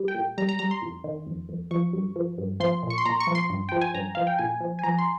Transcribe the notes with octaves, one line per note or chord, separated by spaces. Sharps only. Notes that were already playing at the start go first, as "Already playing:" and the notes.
Already playing: G3
G5
A#2
G3 A#5
A#5
G3 A#5
C6
F2
D#3
F2
F2
F3 C#6
G2
F3
G2
F3 C6
A#2
C#6
C6
A#2 A#5
C#6
F3
C6
G2
F3 G5
G#5
G2 A#5
F3 F5
G5
A#2 G#5
F3
G#5
F3 A#5
C6